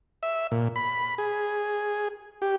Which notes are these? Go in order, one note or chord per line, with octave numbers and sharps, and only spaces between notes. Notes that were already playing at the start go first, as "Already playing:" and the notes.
E5
A#2
B5
G#4
G4